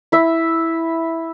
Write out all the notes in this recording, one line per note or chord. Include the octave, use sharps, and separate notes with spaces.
E4 E5